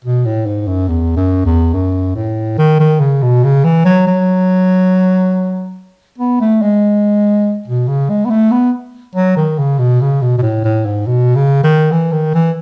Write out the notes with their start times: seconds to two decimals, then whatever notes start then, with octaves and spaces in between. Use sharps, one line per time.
0.05 B2
0.25 A2
0.46 G#2
0.68 F#2
0.88 E2
1.16 F#2
1.45 E2
1.73 F#2
2.15 A2
2.58 D#3
2.80 D#3
3.00 C#3
3.22 B2
3.44 C#3
3.64 E3
3.85 F#3
4.07 F#3
6.18 B3
6.41 A3
6.62 G#3
7.68 B2
7.88 C#3
8.10 G#3
8.25 B3
8.30 A3
8.52 B3
9.15 F#3
9.37 D#3
9.58 C#3
9.79 B2
10.01 C#3
10.21 B2
10.38 B2
10.42 A2
10.64 A2
10.86 G#2
11.07 B2
11.35 C#3
11.64 D#3
11.92 E3
12.12 D#3
12.34 E3